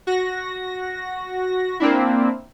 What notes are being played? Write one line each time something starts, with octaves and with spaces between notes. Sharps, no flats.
F#4 A#6
A#3 C4 D4 E4